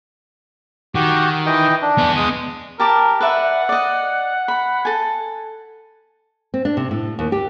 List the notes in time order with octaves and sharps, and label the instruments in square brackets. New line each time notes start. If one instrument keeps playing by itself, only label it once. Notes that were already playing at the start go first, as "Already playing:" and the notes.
[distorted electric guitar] D#3 [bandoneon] F#4 G4
[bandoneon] E3 D#5 G5
D4
[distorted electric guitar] B3 G#4
[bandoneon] G#3 D#6
[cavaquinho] G4 A5 D6 [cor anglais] A#4
[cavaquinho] B4 D5 E5 [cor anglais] F#5
[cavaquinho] D5 D#5
B5
A4 G#5
[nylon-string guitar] C4
D4
C3
A2
D#2
G4